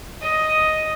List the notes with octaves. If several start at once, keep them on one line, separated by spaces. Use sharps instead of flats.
D#5